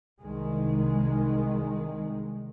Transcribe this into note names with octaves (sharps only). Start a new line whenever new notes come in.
C2 D#3 G#3